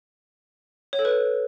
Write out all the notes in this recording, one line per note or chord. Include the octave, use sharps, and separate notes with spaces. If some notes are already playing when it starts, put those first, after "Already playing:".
C#5
A4
B4